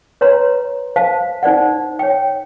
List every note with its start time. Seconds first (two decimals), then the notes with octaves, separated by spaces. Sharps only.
0.21 B4 C#5 A#5 C6
0.96 C5 F5 A5
1.43 D#4 C5 D5 F#5
1.99 C#5 G5